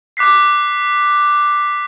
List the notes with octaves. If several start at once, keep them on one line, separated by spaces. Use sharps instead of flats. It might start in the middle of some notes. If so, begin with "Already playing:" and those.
D6 F#6 B6 C7